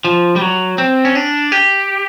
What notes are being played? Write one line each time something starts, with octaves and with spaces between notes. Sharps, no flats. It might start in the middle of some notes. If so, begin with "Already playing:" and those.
F3
G3
F#3
C4
C#4
D4
G4